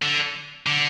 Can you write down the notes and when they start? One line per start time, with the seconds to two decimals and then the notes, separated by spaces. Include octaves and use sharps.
0.02 D3
0.66 D3